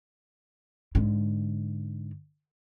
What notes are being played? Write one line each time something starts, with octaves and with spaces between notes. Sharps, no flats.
G#2 D3